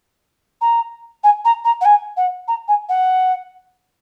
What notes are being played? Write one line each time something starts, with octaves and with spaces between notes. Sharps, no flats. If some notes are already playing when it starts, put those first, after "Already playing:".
A#5
G#5
A#5
A#5
F#5
G#5
F#5
A#5
G#5
F#5